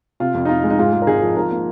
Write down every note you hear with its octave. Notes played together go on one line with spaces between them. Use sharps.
C3 F4
F2
D#4
F2 F4
G#3
D#4
G#2 F4
G#3
A#4
G#1 D#4 G#4
F3
G#2 F4 A#4
A#3